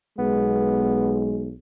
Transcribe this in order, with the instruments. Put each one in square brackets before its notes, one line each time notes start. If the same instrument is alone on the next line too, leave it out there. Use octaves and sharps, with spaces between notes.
[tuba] B1 [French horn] G#3 [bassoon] B3